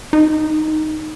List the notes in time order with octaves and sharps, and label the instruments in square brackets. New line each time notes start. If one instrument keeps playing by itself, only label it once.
[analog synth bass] D#4